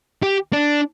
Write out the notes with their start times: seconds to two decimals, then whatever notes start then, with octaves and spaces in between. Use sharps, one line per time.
0.23 G4
0.53 D4